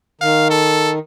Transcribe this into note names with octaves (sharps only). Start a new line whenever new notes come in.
D#3 F5
A4